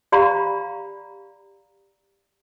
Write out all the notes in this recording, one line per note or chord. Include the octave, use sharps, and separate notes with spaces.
G4 D5 F5 A#5 B5